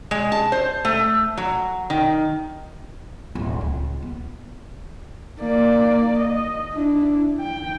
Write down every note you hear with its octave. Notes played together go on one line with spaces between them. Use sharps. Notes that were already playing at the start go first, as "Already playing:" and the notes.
G#3
A5
C5
A3
F#3
D#3
D1
C#2
B3
A#3 D5
D#5
D4 E4
G5